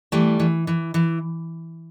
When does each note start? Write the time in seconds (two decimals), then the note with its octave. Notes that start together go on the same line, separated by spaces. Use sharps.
0.12 E3 G3 A3
0.40 E3
0.67 E3
0.94 E3